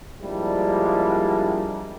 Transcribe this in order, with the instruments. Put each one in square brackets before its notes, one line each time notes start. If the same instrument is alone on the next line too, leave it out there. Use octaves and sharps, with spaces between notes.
[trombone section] F3 G3 G#3 A#3 D4 E4